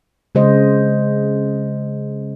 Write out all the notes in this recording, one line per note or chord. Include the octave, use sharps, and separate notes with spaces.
C#3 G#3 C5 D#5